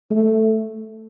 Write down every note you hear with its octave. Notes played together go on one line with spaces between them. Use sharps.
A3